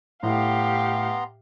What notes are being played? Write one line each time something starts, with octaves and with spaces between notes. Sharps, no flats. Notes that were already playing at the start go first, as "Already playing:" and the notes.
A2 B3 G4 F5 A#5 C6